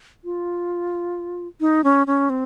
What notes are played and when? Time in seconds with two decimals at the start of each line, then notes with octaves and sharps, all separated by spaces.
0.24 F4
1.61 D#4
1.84 C#4
2.07 C#4
2.30 C4